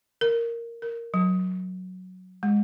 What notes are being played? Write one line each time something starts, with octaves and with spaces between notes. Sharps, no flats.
A#4
A#4
F#3
G#3